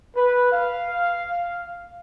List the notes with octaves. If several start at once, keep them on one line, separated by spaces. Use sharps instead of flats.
B4
F5